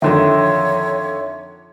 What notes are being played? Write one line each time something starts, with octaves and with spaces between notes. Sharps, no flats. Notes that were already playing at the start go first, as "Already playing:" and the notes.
F2 D3 D#3 C#5 E5 C6